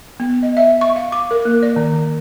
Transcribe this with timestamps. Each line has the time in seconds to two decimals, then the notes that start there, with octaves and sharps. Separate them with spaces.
0.20 B3
0.43 D#5
0.57 E5
0.81 C#6
0.96 F5
1.12 D6
1.31 A#4
1.45 A#3
1.63 D5
1.76 D#3